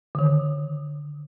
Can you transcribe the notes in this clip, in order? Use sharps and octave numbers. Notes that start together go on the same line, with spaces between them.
D3 D#3